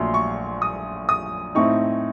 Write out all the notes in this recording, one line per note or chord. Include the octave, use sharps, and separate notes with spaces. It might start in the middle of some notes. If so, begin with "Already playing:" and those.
Already playing: A#1 A#2 F#3 A3 C6
C#6
D#6
D#6
A2 A3 C4 D#4 C#6